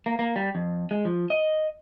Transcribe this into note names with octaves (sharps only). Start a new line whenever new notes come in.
A#3
A#3
G3
F2
G#3
F3
D#5